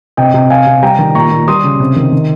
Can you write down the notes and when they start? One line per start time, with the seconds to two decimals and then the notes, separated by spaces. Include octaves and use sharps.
0.17 C3 D#5 G5
0.34 C3
0.50 C3 F5 G#5
0.67 C3
0.83 G3 G5 A#5
0.99 D#3
1.15 A#2 A#5 C#6
1.32 A#2
1.48 G3 C6 D#6
1.64 C#3
1.80 C3
1.96 D#3
2.12 D#3